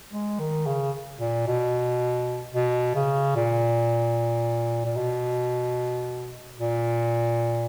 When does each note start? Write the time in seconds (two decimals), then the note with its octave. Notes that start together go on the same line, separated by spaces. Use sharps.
0.12 G#3
0.39 D#3
0.67 C#3
1.20 A#2
1.47 B2
2.54 B2
2.95 C#3
3.36 A#2
4.85 A#2
4.97 B2
6.58 A#2